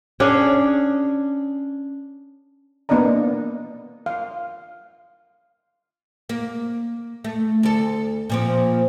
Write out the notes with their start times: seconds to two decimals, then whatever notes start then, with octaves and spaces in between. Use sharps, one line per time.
0.20 C#4 D4 G#4 C#5
2.89 A#3 B3 D4 D5 D#5 A#5
4.06 F5
6.29 A#3
7.24 A3
7.63 D2 A4
8.30 A#2 F3 C4